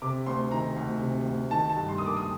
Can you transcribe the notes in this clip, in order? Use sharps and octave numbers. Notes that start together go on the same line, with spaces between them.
C3 D6
D2 C6
D#3 A#5
D2
C3
D2
D#3 A5
A5
G2
C6
A#3 D#6
D6
D#6